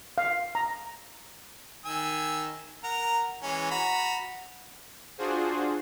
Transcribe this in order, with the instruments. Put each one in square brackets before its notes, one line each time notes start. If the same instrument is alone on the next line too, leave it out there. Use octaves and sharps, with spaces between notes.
[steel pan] F5
A#5
[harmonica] D#3 G#5 E6
A#4 F#5 A#5
E3 G#3 C#4
F#4 A#5 B5
[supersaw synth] D4 F4 F#4 G#4 C5